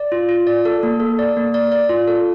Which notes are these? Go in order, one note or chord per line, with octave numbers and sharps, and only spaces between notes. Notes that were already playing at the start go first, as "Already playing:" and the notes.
Already playing: D5
F4
F4
D5
A4
A#3
A4
D5
A#3
D5
D5
F4
A4